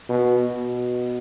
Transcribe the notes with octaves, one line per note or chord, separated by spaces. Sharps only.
B2
B2